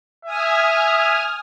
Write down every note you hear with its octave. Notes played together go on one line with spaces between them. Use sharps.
E5 G#5 D#6 F6